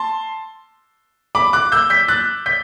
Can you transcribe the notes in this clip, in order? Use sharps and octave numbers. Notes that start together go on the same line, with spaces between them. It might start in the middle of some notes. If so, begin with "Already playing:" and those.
Already playing: A5 C6
B5 D6
D6 F#6
E6 G6
G6 B6
F#6 A6
G6 B6